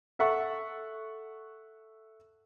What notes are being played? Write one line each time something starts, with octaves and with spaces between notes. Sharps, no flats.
A4 E5 F#5 C#6